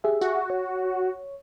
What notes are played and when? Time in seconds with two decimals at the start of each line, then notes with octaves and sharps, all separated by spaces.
0.04 G4 G#4 E5
0.21 F#4
0.50 C#5